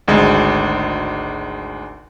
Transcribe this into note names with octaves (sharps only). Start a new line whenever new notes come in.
G#1 D2 G#3